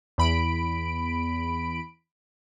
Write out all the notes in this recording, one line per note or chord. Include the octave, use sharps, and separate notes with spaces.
E2 B5 D7